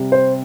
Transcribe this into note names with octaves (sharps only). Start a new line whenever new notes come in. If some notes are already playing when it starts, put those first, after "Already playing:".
Already playing: C3 G3
C5